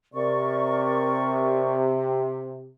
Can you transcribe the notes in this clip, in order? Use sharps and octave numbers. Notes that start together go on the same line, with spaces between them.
C3 A#4 D5 C#6